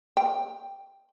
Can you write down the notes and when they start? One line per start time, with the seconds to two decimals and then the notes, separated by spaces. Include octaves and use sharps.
0.17 G5